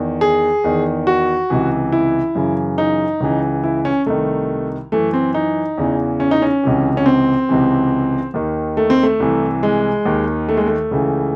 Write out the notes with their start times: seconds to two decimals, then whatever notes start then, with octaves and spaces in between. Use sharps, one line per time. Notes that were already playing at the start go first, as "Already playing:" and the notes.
Already playing: E2 D#3
0.21 G#4
0.64 E2 D#3
1.07 F#4
1.50 C#2 C3 E3
1.92 E4
2.35 F#2 C#3 E3
2.78 D#4
3.21 C#2 C#3 E3
3.64 E4
3.85 C#4
4.06 C2 C3 D#3 A3
4.92 F#2 E3 A3
5.13 C4
5.34 D#4
5.78 E2 C#3 E3
6.20 C#4
6.31 D#4
6.42 C#4
6.64 C#2 C3 E3
6.97 C#4
7.06 C4
7.49 C#2 C3 E3
8.34 D#2 D#3
8.77 A3
8.90 C4
9.03 A3
9.20 C2 C3 E3
9.63 G#3
10.05 D#2 D#3
10.49 A3
10.57 G#3
10.66 A3
10.91 C#2 C#3 E3